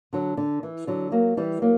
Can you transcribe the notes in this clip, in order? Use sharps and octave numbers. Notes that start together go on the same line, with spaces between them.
D3 F#3
D3
E3
D3 F#3
F#3 A#3
E3 G3
F#3 A#3